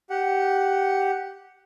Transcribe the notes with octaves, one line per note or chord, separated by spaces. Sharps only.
G4 F#5